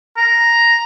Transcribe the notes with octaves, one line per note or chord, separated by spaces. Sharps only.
A#5